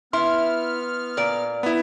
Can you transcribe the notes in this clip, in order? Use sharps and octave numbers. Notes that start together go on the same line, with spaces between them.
B3 E4 C6 F6
A#2 D5
B3 E4